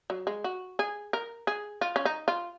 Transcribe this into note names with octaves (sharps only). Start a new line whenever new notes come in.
F#3
G#3
F#4
G#4
A#4
G#4
F4
C#4
D#4
F4